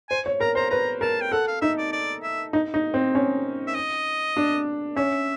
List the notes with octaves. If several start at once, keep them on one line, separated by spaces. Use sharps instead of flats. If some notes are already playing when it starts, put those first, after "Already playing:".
C5 G#5
C#5
A#4 A#5
C5 A#5
B4 A#5
A#4 A5
G5
A4 F#5
F5
D#4 E5
D5
D5
E5
D#4
D#4
C4
C#4
E5
D#5
D4
C#4 E5